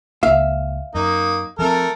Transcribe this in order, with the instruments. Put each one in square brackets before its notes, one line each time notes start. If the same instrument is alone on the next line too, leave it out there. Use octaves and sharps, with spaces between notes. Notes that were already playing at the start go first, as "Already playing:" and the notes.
[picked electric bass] C#2 A#3 [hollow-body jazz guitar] E5 F5
[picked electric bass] F#2 [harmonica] A#3 D#4
[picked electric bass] F3 C4 [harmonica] A3 A4 A#4